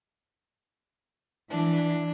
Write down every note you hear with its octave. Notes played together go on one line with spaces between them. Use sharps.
E3 D4